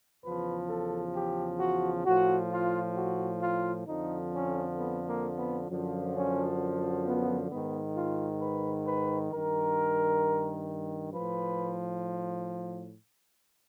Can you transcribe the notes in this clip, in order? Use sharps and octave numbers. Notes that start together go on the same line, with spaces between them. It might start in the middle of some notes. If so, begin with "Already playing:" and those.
E2 C#3 F3 B4
A4
G4
F#4
A2 F3 F#4
F4
F#4
F4
F2 D3 F3 D#4
C#4
B3
A#3
B3
F#2 D3 F3
C#4
B3
G#2 D#3 B3
F4
B4
B4
G2 D#3 A#4
A2 F3 B4